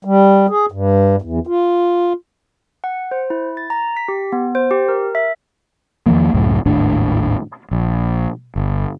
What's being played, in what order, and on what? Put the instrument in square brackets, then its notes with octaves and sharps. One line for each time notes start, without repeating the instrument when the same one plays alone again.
[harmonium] G3
G#4
G2
E2
F4
[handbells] F#5
C5
E4
A6
A#5
B6
G4
B3
C5
G4
A#4
E5
[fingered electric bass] E2 D#3 F3 A#3
C#2 F#2 A2
G#1 D#2 A2 D4
A#1
G1